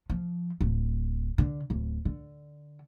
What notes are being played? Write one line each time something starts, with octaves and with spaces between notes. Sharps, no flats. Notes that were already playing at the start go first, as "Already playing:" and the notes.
F3
D1
D3
D1
D3